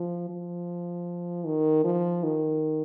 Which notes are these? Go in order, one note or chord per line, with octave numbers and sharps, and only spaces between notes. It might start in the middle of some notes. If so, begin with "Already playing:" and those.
Already playing: F3
F3
D#3
F3
D#3